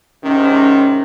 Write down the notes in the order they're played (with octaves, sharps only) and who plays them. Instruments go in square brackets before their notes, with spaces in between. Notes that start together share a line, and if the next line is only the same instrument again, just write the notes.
[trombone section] G#2 C3 D#3 [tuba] C#4